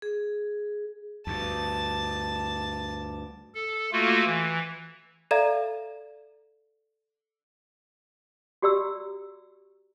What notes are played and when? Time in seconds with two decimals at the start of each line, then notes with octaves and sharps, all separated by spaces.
0.02 G#4
1.27 D2 G2 A5
3.54 A4
3.92 A3 A#3 F4 F#4 A4
4.25 E3
5.31 A4 D5 E5 F5 A#5 G#6
8.62 F#4 G4 D5 A#5 E6